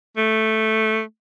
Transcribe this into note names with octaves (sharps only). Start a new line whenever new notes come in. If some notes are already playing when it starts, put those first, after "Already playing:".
A3